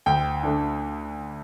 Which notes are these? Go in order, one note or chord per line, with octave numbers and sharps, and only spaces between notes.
D2 G5
D3 A3 D4